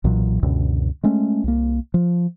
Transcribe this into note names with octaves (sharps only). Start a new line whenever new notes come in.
B1 A#2 E3 F#3
C#2 F#2 B2 D3
G#3 A3 C#4
C2 A#3
F3